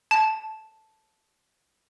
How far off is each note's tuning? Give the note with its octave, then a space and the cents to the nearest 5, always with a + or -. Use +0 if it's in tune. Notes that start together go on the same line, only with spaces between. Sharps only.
A5 -10